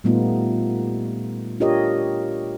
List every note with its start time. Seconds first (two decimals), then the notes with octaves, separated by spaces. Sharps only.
0.04 A#2 G3 A3 B3 D#4 F4
1.60 D4 F4 G4 A#4 C#5 D#5